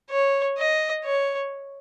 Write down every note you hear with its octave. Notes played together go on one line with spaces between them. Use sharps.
C#5
D#5
C#5